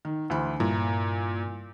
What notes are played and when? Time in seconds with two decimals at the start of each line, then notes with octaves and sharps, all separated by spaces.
0.05 D#3
0.30 D2 E3 B5
0.60 G2 A#2 E4 A#5